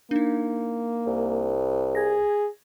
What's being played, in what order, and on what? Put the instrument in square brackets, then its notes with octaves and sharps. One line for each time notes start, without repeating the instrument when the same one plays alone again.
[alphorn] A#3 [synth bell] D4 D#4
[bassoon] C2
[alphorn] G#4 [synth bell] G#6 A#6